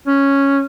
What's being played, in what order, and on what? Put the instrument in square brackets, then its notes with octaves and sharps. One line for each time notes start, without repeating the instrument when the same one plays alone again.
[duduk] C#4